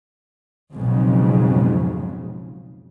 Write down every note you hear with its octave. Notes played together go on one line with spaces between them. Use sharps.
B1 F2 G#2 C#3